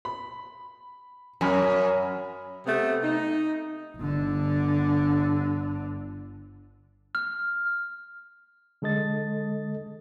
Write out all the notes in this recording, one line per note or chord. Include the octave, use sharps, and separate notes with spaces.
B5
F#2 G#5 B5 F6
C3 A3 B3
D#4
G1 D3
F6
D3 G#3 A4 D#5 A6